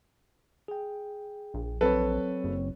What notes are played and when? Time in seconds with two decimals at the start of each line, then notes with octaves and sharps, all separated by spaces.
0.68 G#4 G5
1.54 A#1
1.81 F#3 C4 A4 B4 C#5
2.44 F#1